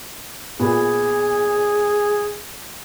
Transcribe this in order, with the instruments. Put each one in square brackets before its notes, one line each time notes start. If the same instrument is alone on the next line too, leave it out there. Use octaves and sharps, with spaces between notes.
[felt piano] A#2 B3 [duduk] G#4